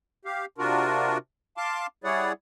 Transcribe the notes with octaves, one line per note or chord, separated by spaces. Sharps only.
G4 F5
C3 D4 F4 F#4 A#4
F5 A5 C6 D6
G3 E4 G#4 C#5 D5 F#5